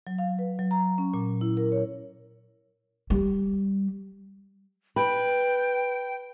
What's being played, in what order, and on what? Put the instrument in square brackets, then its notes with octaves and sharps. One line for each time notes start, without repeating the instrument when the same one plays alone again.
[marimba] F#3
F5
B4
F#3
A#5
C#4
A#2
E4
A#4
C#5
[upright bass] G3
[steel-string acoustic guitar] B4 [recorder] G5